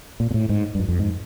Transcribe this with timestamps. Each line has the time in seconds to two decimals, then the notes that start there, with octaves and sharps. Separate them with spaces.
0.20 A#2
0.31 A#2
0.34 A2
0.49 G#2
0.75 G2
0.80 F#2
0.88 F2
0.99 G#2